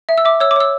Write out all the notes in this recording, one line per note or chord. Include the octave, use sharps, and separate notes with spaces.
E5
E6
E5 D6
C#5 E6
D6
C#5 E6